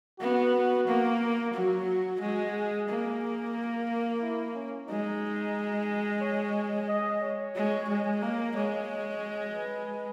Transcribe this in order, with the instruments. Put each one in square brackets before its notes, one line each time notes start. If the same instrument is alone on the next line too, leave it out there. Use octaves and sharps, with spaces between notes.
[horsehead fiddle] B3 [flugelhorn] F#4
[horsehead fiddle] A#3
[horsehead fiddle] F#3 [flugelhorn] F#4
[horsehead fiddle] G#3 [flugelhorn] F#4
[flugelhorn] G#4
[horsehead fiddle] A#3
[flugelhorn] E4
C#4
[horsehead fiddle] G#3 [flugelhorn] D#4
[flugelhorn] C#5
D#5
C#5
[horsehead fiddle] G#3
G#3
[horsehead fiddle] A#3 [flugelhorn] A#4
[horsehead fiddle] G#3 [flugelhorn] C#5
[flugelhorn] B4